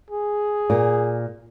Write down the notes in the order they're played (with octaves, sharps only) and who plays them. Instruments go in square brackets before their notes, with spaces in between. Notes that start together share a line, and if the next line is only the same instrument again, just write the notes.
[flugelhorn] G#4
[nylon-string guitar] A#2